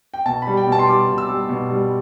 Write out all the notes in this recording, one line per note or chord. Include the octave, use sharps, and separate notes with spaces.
G5
B2 A5
G3 B5
G5
B2
A5
C6
G3 D6
B2
E6
G3
B2
G3